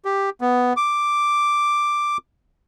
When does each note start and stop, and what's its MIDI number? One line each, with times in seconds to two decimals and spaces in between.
0.05 0.30 67
0.41 0.73 59
0.77 2.17 86